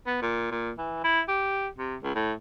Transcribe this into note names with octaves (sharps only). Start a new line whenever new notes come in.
B3
A#2
A#2
E3
E4
G4
C3
C#2
A2